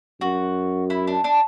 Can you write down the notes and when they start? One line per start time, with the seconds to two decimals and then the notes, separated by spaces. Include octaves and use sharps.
0.21 F#2 F#4
0.90 E4
1.07 D4
1.24 D4